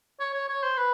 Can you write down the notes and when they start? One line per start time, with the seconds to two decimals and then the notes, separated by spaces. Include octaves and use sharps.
0.20 C#5
0.34 C#5
0.49 C#5
0.63 C5
0.77 B4